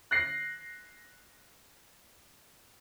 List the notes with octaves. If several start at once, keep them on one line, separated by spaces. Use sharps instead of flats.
F#6 A#6 C7